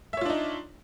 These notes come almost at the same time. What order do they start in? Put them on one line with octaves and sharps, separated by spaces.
E5 C#5 F4 D4 D#4